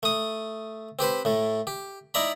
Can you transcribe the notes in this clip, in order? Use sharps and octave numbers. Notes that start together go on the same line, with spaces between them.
A3 D#6
C4 G4 B4 C5
A2 A3
G4
D#4 E4 D5 A#5 B5